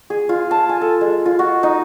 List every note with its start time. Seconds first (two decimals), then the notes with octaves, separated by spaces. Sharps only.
0.10 G#4
0.29 F4
0.51 A5
0.69 G#5
0.81 A4
1.01 G#3
1.26 F4
1.39 F#4
1.63 D#4